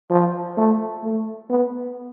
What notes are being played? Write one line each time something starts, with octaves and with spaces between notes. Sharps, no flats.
F3
A3
A3
B3